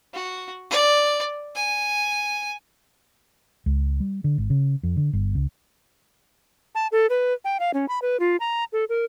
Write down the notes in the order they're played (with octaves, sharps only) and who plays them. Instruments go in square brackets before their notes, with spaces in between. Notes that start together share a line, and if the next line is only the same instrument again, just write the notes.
[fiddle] F#4
D5
G#5
[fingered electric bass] C#2
G3
D3
G#1
C#3
F2
D3
G1
C#2
[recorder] A5
A4
B4
G5
F5
C#4
B5
B4
F4
A#5
A4
A#4